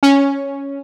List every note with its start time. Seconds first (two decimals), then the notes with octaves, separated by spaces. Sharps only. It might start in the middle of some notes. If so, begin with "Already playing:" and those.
0.03 C#4